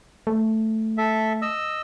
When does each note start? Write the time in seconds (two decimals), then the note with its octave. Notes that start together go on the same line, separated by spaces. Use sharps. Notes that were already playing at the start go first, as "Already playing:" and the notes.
0.27 A3
0.98 A4 E5
1.42 D#5 E6